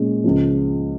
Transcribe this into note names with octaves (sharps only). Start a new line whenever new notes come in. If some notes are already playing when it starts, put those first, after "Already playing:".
Already playing: A#2 G#3 C#4
C#2 C#3 F3